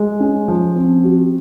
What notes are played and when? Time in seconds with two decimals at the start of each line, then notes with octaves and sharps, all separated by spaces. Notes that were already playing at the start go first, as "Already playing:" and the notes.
Already playing: G#3
0.20 C#4
0.48 F3
0.76 C4
1.04 F#4